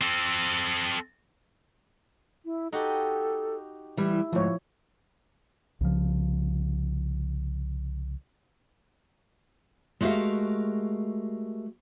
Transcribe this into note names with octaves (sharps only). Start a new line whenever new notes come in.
C4 A4
E4
D#4 F#4 G4 A4
E3 G3 E4
D2 G#2 F3 C#5
C2 C#3 F3
G#3 A3 F#4 G4 A#4 F5